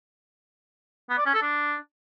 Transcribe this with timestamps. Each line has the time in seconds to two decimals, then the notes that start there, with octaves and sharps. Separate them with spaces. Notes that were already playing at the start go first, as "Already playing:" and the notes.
1.10 B3
1.18 D5
1.26 C#4
1.34 A4
1.42 D4